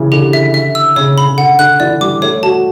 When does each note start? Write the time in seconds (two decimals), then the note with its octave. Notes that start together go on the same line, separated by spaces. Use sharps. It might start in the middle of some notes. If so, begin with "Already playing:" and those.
Already playing: C#3 E3
0.12 D3 G4
0.33 E5
0.54 E5
0.75 E6
0.96 C#3 C#5
1.18 B5
1.28 C#3
1.38 D3 F#5
1.59 D3 F#6
1.80 E3 D5
2.01 G3 D6
2.22 A3 C#5
2.43 F#4 A5